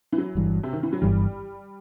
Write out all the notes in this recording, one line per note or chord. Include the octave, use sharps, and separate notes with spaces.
E3
F#3
G1 G2 E3
C3
D#3
E3
F#3
G1 G2 E3 G3